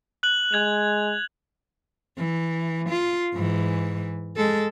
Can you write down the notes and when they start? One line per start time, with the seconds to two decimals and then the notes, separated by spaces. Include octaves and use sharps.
0.23 F#6 F#7
0.53 G#3 F#6 G#6 F7
2.18 E3
2.90 F4
3.34 G#2 E3
4.36 G#3 A4